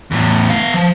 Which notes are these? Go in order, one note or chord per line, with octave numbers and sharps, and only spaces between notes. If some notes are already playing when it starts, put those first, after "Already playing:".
E2 A2
B3 F5
F3